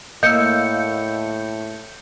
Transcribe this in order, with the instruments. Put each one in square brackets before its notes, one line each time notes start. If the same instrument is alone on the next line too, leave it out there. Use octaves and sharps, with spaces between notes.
[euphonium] A2 [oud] A#3 [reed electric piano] D#5 F5 E6 [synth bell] G6 C#7